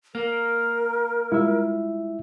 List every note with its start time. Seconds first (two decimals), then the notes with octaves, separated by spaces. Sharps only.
0.15 A#3 A#4 F6
1.32 G3 G#3 E4 F4 E5